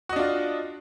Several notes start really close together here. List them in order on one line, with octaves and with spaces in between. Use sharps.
F#4 D#5 D4 F4